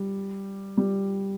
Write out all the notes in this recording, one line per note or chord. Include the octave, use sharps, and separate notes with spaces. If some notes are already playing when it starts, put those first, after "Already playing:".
Already playing: G3
G3